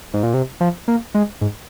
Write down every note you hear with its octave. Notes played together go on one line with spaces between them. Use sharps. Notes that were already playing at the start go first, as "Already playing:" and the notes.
G#2
A#2
C3
F3
A#3
G#3
G#2